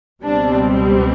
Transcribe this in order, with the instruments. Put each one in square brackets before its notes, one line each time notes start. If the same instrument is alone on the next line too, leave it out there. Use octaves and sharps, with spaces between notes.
[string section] C#2 B2 G3 C4 D4